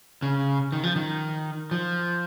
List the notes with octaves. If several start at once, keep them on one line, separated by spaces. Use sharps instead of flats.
C#3
D#3
F3
D#3
F3